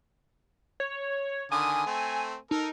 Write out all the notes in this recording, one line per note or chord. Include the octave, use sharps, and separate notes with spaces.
C#5
D3 D#3 G#5 D#6
A3 C4
D#4 A4 A#4